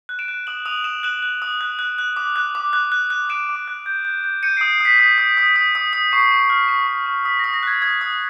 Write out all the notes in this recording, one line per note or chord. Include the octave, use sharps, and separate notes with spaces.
F#6
D7 E7
F#6
D#6 E7 F#7
D#6 D#7 F7
D#6 E7 F#7
F#6 E7 F#7
F#6
D#6
F#6
F#6
F#6
D6
F#6
D6
F#6
F#6
F#6
F#6 D7 E7
D6
F#6
G6
G6
G6
G6 C#7 D#7
D#6 C7 D7
C7
D#6 B6
D#6 B6
D#6
D#6
D#6
D#6
D#6
C#6 C7
C#6
F6
C#6
C#6
C#6
D#6 B6
D#6 A#6
A#6
F#6 G#6
D#6 G#6
D#6